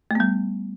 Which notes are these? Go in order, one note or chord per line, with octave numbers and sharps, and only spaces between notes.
G3 A3 B3